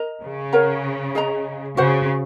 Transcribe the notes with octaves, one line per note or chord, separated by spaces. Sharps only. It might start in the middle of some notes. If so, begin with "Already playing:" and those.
Already playing: A#4 D#5 A#5
C#3
A#4 C#5 F#5 A#5
G#4 D#5 A#5
C#3 F#4 C5 F#5